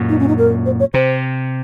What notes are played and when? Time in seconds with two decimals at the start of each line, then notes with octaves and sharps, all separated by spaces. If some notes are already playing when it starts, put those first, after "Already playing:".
Already playing: F#2 A#2
0.09 D#4
0.19 C#4
0.28 D#4
0.38 A#4
0.66 C5
0.80 C#5
0.94 C3 C5